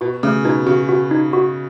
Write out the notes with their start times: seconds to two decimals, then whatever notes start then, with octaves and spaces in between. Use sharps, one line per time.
0.01 B2 F#4
0.23 C#3 A3
0.44 B2 D#4
0.67 C#3 F#4
0.89 F#4
1.11 D#4
1.33 F#4